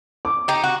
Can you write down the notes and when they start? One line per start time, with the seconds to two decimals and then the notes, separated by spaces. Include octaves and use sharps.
0.25 D6
0.48 D#4 G4
0.64 F#4